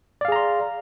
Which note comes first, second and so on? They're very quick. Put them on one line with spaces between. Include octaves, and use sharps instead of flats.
D5 F5 G#4 A#5 C6